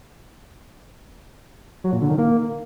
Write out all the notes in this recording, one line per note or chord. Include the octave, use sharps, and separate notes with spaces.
F#3
A#2
D3
D#3
A#3